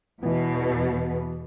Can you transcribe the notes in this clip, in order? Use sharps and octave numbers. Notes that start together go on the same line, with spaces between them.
E2 B2 E3 B3